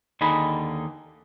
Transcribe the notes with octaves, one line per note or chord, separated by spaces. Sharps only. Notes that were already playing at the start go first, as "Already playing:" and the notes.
D#2 D3 D#4 G#4 B5